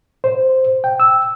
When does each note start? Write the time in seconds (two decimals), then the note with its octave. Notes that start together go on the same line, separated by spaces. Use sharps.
0.24 C5
0.84 G5
1.00 E6